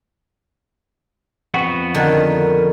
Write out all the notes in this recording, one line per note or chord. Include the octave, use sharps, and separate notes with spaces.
F2 B3 F#4
D3 D#3 A#4